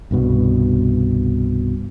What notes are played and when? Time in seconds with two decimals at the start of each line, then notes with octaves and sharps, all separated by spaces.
0.11 C2 G2 B2